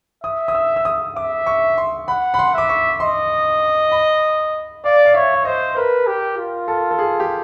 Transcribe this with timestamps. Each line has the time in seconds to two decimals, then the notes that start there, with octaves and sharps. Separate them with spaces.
0.24 E5 D#6
0.48 D#6
0.55 E6
0.76 E6
0.85 D#6
1.16 E5 D6
1.47 C#6
1.78 C6
2.08 F#5 B5
2.34 B5
2.39 C6
2.54 E5 D6
2.69 C#6
3.00 D#5 C6
3.92 B5
4.84 D5 F5
5.05 F5
5.14 C#5 E5
5.34 E5
5.45 C5 D#5
5.77 A#4 B4
6.07 G4
6.38 F4
6.68 A4
6.91 A4
6.99 G#4
7.20 G4